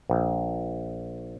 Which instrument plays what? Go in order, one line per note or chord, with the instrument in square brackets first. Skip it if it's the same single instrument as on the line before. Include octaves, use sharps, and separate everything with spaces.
[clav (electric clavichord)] A#1